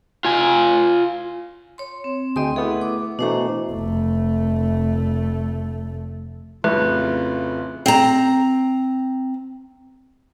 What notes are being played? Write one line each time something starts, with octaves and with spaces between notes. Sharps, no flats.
F4 G#5
C#5 C6
C4
D2 G#4 D#5 G5 C6
A3 B3 E4 G#4
D6
B2 E3 A3 D4 C5 A#5
F1 A3
A1 F2 C#3 F4 B4
C4 A#5